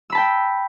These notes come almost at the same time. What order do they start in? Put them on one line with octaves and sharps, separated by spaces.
E6 B5 A5 G5